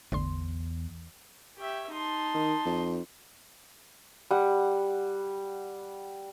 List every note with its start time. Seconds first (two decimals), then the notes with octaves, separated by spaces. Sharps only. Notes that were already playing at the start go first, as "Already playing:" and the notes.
0.12 A1 E2 D3 C6
1.58 G4 C#5 E5 G5
1.91 D#4 A5 C6
2.34 D#3
2.65 F2
4.31 G3 F#5